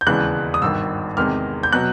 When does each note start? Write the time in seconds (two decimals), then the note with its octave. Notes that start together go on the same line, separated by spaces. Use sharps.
0.01 G6
0.06 E1 D#2 C#3 E3 G#3 F#6
0.54 D#6
0.62 G#1 G2 D#3 E6
1.17 E2 C3 D#3 G#3 F6
1.63 G6
1.73 B2 F#3 F#6